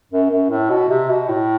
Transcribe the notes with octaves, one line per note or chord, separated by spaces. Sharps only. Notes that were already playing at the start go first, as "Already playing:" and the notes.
F#2
F#2
A2
B2
C3
B2
A2